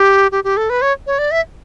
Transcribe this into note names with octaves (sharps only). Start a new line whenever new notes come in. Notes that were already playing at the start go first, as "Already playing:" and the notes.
Already playing: G4
G4
G4
A4
B4
C#5
C#5
D5
E5